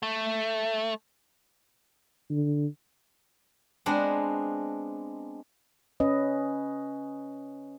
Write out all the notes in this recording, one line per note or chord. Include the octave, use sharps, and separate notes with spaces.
A3
D3
G#3 B3 C4 D4 C5 D#5
C#4 B4 D#5